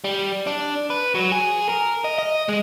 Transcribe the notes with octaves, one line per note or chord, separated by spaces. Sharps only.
G3
D4
B4
F#3
G#4
A#4
D#5
D#5
G#3